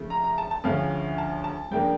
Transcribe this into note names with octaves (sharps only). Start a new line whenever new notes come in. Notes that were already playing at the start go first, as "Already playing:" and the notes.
Already playing: C#3 F3 A3
A#5
A#5
A5
A5
D2 C#3 F3 C#4 F5
A5
A5
C#3 F3 A#3 D4 G5